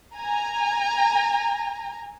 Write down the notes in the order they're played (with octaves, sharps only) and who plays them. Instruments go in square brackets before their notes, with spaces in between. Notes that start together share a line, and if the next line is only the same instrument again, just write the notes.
[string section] G#5 A#5